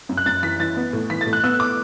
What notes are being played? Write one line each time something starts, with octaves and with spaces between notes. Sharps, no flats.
F#2
F#6
F#2 A6
E3 B6
E3 A6
B3
A2
E3 B6
A6
A2
F#6
B3 E6
D6